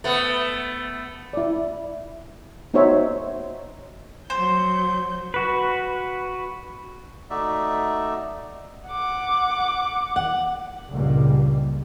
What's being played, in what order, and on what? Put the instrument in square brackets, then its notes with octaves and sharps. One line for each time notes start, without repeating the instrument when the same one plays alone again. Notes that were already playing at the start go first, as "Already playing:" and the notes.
[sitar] A3 B3
[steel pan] E4 D5
B3 D#4 F#4 C5 C#5 E5
[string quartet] F#3 G6 [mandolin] C5
[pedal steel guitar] F#4 B4
[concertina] A3 D#4 F#4 D5 E5
[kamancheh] F#5 D6
[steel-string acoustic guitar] F#5
[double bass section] C#2 G2 A#2 G3 A#3